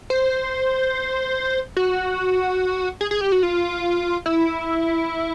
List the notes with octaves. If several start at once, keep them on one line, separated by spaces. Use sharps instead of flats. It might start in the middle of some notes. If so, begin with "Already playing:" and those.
C5
F#4
G#4
G#4
G4
F#4
F4
E4